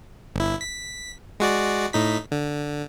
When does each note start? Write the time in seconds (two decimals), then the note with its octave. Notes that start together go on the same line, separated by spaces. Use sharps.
0.36 G1 E4
0.61 B6
1.40 G#3 F#4 D5
1.93 A2 D#4 B6
2.32 D3